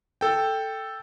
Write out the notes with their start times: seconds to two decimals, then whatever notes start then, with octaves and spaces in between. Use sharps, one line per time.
0.21 A4 G5